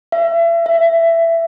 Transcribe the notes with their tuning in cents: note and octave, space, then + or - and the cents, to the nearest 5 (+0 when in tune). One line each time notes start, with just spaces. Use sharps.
E5 +35
E5 +15